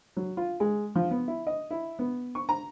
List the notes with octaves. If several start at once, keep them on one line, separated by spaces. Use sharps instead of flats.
F#3
F4
G#3
F3
B3
E4
D#5
E4
B3
C#6
A#5